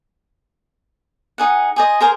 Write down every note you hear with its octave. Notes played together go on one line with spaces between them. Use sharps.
D#4 G#4 F#5
G#4 C5 D#5
G#4 A#4 C5